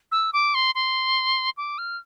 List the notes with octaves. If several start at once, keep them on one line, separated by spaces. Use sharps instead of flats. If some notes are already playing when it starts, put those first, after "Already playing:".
E6
D6
C6
C6
D6
F6